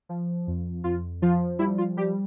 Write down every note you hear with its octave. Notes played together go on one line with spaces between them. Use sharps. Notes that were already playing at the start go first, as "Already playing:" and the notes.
F3
F2
F2 F4
F3 F4
G3 E4
F4
G3 G4